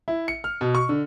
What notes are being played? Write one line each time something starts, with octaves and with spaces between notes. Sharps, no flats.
E4
C#7
F6
B2
C#6
D3